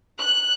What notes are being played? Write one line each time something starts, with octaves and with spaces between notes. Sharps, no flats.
F#6